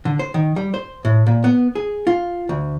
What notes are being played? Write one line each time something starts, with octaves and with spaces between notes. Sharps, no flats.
D3
C5
D#3
G3
C5
A2
A#2
B3
G#4
F4
D2